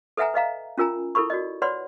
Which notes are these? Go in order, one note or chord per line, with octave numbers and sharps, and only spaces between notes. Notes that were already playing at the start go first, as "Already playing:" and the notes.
A4 B4 E5 F#5 G#5 A#5
B4 D#5 F5 A#5
C#4 F4 A#4 G#5 A#5
E4 A4 A#4 B5 C#6
F#4 D5 D#5
B4 C#5 D5 F#5 B5 C6